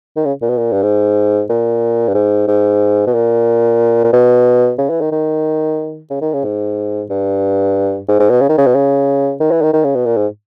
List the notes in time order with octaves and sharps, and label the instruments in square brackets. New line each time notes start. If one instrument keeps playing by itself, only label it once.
[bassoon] D#3
C#3
A#2
B2
A#2
G2
G#2
A#2
G2
G#2
G#2
B2
A#2
A#2
B2
C#3
E3
D#3
D#3
C#3
D#3
C#3
G#2
G2
G#2
G#2
B2
C#3
D#3
C#3
B2
C#3
D#3
E3
D#3
D#3
C#3
B2
A#2
G#2